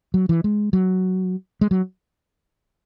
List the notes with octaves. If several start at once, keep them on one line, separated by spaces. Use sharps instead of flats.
F#3
E3
G#3
F#3
G#3
F#3